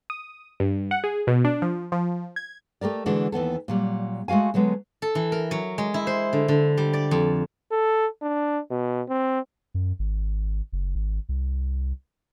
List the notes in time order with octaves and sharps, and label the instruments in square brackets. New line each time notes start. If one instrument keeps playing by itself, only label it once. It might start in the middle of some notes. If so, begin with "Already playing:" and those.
[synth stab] D#6
G2
F#5
G#4
B2
D4
F3
F3
G#6
[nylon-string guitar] A3 G4 A#4 D5
D3 E3 G#3 D4 F#4
D#2 E3 B3 A4
A#2 F#3 G3
G#3 A3 F#4 F5 G#5
D3 F#3 G#3 B3
[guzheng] A4
E3
A#4
F#3
G#3
E4
C5
D3
D3
G3
D5
F2
[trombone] A4
D4
B2
C4
[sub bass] F#2
G#1
F#1
G#1
C2